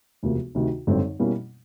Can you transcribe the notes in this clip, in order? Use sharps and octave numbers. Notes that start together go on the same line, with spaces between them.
E1 D2 C3 F3 A#3
D2 C3 D#3
G#1 F#2 D3 G3 C4
B2 G3 A#3 C#4 E4